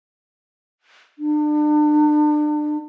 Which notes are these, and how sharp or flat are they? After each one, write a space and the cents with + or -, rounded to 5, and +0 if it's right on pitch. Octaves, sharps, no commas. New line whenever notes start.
D4 +35